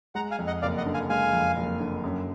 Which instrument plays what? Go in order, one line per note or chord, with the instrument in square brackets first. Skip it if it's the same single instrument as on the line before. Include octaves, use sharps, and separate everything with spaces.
[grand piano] G#3 [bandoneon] F#5 A#5
[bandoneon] F5 G#5
[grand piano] F2
[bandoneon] D#5 F#5
[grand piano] F#1 [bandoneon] D5 F5
[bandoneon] D#5 F#5
[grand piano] D3
[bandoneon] F5 G#5
[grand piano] G#3 [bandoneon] F5 G#5
[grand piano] F2
F#1
D3
F#2